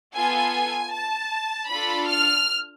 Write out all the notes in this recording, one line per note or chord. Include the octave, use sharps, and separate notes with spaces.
B3 F4 A4 G#5
A5
D4 F4 A4 B5
F6